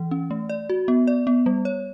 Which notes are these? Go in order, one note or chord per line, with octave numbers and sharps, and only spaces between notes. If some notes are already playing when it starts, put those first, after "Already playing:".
Already playing: E3
C#4
A3
D5
F#4
B3
D5
B3
G3
C#5